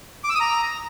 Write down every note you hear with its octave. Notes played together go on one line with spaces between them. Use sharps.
D6
E6
D#6
A#5